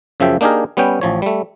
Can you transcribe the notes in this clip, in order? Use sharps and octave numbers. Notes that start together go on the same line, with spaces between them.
F#2 C#3 F3 E5 G5
A#3 D4 D#4 G4 G#4 A#4
G3 B3 C#4 G5
A1 F3 C#5
G3 A3